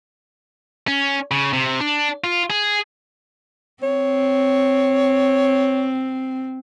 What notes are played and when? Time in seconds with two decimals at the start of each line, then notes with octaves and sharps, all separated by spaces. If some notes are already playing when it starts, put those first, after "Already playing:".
0.88 C#4
1.31 C#3
1.53 C3
1.80 D4
2.24 F4
2.50 G#4
3.83 C4 C#5